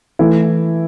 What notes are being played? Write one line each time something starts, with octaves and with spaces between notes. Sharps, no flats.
E3 A3 E4